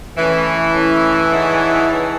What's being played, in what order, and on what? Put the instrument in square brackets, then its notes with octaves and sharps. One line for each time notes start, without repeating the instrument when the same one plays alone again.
[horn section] E3 [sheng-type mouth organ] A3 C#4 E4
[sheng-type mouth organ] A3 C#4 E4
D#4 G#4 C#5 F#5 A5
D#4 G#4 C#5 F#5 A5